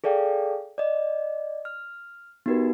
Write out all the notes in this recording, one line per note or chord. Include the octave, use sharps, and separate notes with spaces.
G#4 A4 D5 F5 G5
D5 D#5
F6
B3 D#4 F#4 G4 A#4 B4